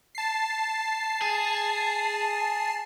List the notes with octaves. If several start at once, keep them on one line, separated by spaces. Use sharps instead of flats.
A5 C7
G#4